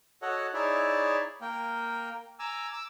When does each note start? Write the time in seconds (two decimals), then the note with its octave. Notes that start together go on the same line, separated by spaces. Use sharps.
0.22 F#4 A4 C#5 D#5 F#5
0.54 D#4 E4 G#4 C#5 D5 E5
1.41 A#3 A#4 G5
2.39 G#5 A#5 D6 E6
2.73 D6 E6